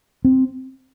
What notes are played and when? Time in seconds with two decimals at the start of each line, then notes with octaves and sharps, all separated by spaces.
0.25 C4